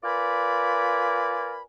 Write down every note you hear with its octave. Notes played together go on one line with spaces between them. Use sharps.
F4 A#4 B4 D5 G#5 B5